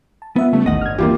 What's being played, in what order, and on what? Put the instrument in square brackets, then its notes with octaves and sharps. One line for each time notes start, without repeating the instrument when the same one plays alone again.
[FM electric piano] A5
[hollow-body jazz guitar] B3 [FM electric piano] F4 E5 F#5
[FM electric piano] C#3 G3 C#4 [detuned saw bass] A3
[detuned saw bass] A1 [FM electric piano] D#2 D#3 [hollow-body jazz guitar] D#5 F#5
[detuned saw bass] G1 [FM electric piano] F6 G#6
[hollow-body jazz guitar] D#2 [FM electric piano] E3 D4 [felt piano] A#3 F4 G4